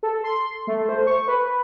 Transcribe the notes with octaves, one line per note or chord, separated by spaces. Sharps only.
A4
C6
A3
C5
C#6
B4